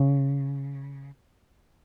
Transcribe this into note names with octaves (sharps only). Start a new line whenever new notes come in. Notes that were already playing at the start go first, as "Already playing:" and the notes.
Already playing: C#3